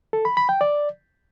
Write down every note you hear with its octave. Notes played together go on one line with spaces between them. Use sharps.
A4
B5
B5
G5
D5